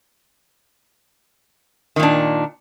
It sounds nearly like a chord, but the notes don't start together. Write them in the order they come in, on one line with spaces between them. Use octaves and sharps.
D#3 A#2 D4